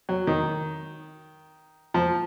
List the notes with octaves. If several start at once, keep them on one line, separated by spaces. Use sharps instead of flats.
F#3
D#3
F3